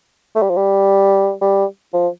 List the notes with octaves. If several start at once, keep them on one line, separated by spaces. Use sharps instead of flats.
A3
G3
F3
G3
G3
F3